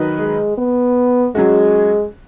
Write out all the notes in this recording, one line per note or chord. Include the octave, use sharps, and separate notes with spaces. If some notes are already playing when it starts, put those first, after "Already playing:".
Already playing: D#3 F#3 D#4 B4 D#5
G#3
B3
F#3 G#3 C#4 F#4